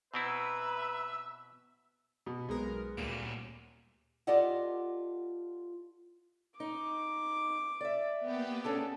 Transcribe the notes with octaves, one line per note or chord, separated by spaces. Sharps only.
B2 C4 E4 B4 E5 A#5
B2
B1 G#3 B3 A#4
D2 A#2 G3 A#3 D7
F4 G4 A4 D5 D#5 F#5
D#4 D6
D5 E5
A#3 B3 G4
C#4 D4 G#4 A4